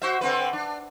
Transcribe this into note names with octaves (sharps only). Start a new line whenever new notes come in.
F#4 C5 E5
D3 C4 B4
D4